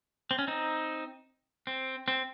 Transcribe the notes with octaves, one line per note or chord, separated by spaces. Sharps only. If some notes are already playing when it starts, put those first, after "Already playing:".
C4
C#4
C4 D#4
C4
C4